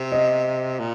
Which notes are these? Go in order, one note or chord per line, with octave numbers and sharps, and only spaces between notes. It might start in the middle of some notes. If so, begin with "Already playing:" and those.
Already playing: C3
D#5
A#2